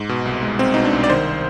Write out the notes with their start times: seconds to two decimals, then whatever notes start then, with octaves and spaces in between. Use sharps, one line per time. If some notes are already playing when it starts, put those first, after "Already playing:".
Already playing: G#2
0.09 B2
0.25 C2
0.43 G#3
0.59 C2 C4
0.74 B2 D#4
0.85 D4
0.93 C2
1.04 D5
1.10 D#3 C5